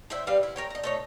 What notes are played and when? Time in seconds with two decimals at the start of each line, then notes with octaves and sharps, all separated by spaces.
0.10 A2 E4 C5 E5
0.27 E3 G3 B4 F5
0.43 E4
0.56 A#4 C#5 G5
0.70 D#5 A#5
0.83 A3 D#4 C#5